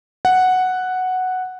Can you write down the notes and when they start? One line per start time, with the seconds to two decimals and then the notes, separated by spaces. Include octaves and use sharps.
0.25 F#5